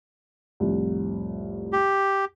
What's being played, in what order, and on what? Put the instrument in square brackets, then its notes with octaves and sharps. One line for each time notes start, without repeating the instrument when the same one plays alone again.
[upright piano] C2 F2 A2
[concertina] G4